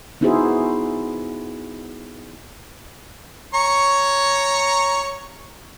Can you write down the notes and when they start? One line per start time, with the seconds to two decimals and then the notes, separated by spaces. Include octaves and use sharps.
0.21 B3 D#4 E4 F#4 G#4 C5
3.54 C#5 A#5 C#6